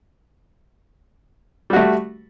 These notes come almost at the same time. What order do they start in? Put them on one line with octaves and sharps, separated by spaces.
G3 F#4 A3